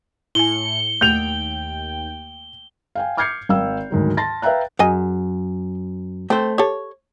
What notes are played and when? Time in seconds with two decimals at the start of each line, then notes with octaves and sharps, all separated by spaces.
0.35 A2 E4 G#5 C#7 G7
1.01 D#2 A3 G5 G6 F7
2.95 F5 G5 G#5
3.17 D6 F6 G6 G#6 C7 C#7
3.49 G#1 F5 G5 E6
3.91 D2 G#2 D#3 F#3
4.17 A5 C6 A6 A#6
4.42 B4 E5 F5 G5 A#5 F#6
4.79 F#2 G#4 D#5 G#5
6.30 A3 C4 C5
6.58 G4 A4 C#5